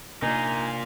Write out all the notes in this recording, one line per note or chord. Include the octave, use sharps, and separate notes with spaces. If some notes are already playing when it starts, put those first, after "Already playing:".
C3 A#3 D4 D#4 F4 G#5 A#5